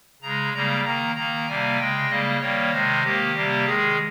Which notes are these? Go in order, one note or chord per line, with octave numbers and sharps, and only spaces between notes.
C#3 G#3 A#5
C#3 G3 A#3 A#5
D#3 A#3 A#5
D#3 A#3 A#5
C3 G3 A#3 G#5
C#3 G#3 G5
C#3 G3 A#3 D#5
D#3 G3 A#3 C#5
C3 D#3 G#3 C5
D#3 A#3 G4
C3 G3 A#3
D#3 G#3 G#4